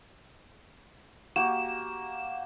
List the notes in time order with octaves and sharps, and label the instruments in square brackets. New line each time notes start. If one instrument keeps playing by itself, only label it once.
[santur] A#3 F#4 G4 [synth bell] E7